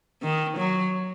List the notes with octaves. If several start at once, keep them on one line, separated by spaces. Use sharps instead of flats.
D#3
F#3